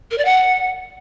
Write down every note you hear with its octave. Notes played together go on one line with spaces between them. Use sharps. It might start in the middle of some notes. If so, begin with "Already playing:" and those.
A#4
D5
F#5